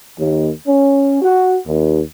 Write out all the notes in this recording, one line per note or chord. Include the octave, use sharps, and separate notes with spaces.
D#2
C#4
F#4
D#2